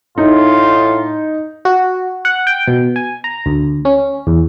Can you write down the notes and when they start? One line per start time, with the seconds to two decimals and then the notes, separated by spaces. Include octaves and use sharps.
0.18 A2 D#4 F4
1.65 F#4
2.25 F#5
2.47 G5
2.68 B2
2.96 G#5
3.24 A#5
3.46 D2
3.85 C#4
4.27 E2